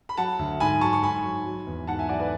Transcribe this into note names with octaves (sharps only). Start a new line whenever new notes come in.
B5
F#3 F#5 A5
D2
G#2 G#5 B5
F#3 A5 C#6
C#6
G#2 G#5 B5
F#3
F#3
E2
G#2 F#5 A5
E5 G#5
F#3 D5 F#5
B4 D5